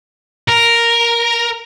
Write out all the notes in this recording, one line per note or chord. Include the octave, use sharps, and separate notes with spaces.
A#4